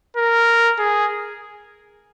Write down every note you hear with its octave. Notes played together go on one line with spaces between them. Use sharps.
A#4
G#4